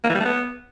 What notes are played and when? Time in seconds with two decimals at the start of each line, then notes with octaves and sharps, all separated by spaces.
0.04 A#3
0.09 E3
0.15 G3
0.20 A3
0.25 B3